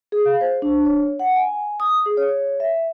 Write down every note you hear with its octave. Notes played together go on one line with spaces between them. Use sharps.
G#4
F5
C5
D4
C#5
F#5
G#5
D#6
G#4
C#5
E5